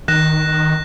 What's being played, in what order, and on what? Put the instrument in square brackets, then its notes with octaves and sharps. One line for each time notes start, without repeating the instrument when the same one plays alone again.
[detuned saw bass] D#3 [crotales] F#6 A#6 E7